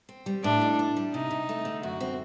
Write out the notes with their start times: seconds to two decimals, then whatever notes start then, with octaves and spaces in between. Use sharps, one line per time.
0.09 C4
0.26 G3
0.43 A2 D4
0.61 D#4
0.79 D4
0.97 G3
1.13 C3 D#4
1.31 C3
1.49 A3
1.65 D3
1.83 F#2 F#4
2.00 C4